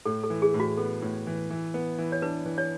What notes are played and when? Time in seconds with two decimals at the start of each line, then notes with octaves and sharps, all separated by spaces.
0.06 A2 A4
0.24 A4
0.30 E3
0.42 G#4
0.54 A2
0.60 F#4
0.78 B3 A4
1.02 A2
1.27 E3
1.50 E3
1.74 B3
1.98 E3
2.12 C#5
2.22 D4 B4
2.46 E3
2.58 C#5